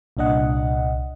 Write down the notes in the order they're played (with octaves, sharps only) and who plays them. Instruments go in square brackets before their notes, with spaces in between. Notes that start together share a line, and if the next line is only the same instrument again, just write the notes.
[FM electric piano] C2 A#2 D4 D#5 F#5